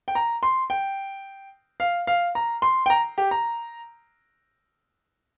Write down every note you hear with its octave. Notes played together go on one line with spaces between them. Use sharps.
G5
A#5
C6
G5
F5
F5
A#5
C6
G5
A#5
G4
A#5